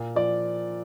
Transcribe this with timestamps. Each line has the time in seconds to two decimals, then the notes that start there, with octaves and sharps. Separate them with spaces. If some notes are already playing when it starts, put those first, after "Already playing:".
Already playing: A#2
0.16 F3 D5